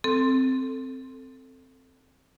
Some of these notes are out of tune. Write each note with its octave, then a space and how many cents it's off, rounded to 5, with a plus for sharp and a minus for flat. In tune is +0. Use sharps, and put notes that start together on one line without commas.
C4 +0 A4 +10